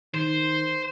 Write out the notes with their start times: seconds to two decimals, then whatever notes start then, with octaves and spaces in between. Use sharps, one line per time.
0.14 D#3 C5